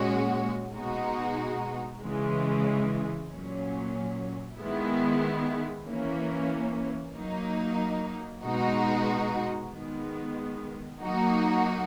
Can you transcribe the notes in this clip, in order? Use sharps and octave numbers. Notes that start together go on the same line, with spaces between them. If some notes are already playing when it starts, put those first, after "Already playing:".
Already playing: A#2 G#3 C#4 F#4
B2 G#3 D#4 F#4
C#3 E3 G#3
A#2 F#3 C#4
D#3 G#3 B3 E4
E3 A#3 C#4
F#3 A#3 D#4
B2 G#3 D#4 F#4
D#3 G#3 B3
F#3 A#3 D#4 F#4